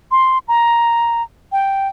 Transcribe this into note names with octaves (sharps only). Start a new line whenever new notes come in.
C6
A#5
G5